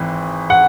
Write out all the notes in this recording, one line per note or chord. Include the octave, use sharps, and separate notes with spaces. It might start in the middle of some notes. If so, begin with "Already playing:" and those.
Already playing: G#1 E3
F#5